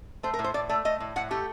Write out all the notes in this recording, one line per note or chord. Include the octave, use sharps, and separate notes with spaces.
A3 C5
A#4
A2
C5
A2 D5
A3 D5
A3 D#5
A2
A2 F#5
A3 G4